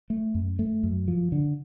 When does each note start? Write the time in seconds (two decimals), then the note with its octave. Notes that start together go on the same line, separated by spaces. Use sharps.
0.10 A3
0.35 F#2
0.59 A3
0.83 F#2
1.08 F3
1.32 D3